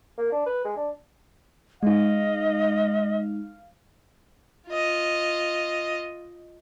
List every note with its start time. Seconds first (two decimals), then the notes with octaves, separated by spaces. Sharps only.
0.18 A#3
0.32 D4
0.46 B4
0.64 G#3
0.76 D4
1.83 G#3 D#4 D#5 F5
4.69 F4 D#5